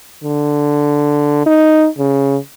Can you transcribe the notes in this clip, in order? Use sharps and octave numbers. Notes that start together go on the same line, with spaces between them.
D3
D#4
C#3